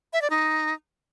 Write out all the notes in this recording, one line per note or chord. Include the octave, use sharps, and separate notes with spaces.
E5
D5
D#4